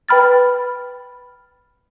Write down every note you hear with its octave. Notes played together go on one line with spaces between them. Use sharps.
B4 G5 B5 F6 A6